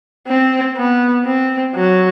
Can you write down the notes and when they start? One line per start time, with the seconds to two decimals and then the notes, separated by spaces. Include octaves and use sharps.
0.27 C4
0.77 B3
1.25 C4
1.75 F#3